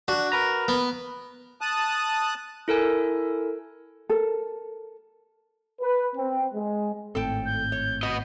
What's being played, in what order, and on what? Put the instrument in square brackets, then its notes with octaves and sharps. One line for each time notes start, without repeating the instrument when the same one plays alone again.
[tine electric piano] D4 [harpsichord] F#4
[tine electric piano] A#4 B4 A#5
[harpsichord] B3
[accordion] A5 D#6 F#6
[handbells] E4 A4 A#4 G#5
[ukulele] A4 A#4
[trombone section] B4
C4
G#3
[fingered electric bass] G#1 A2 C4 [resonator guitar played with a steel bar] A4 G5
[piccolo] G6
[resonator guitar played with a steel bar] C#5
[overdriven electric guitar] B3 D#5 [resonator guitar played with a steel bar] F#4